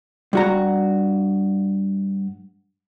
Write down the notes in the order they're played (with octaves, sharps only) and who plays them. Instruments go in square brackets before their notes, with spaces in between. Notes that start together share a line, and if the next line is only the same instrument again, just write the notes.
[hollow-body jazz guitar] G2 F#4 A#5